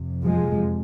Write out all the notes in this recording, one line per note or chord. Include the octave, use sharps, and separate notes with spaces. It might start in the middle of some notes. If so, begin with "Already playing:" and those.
Already playing: F2 C3
F3 G#3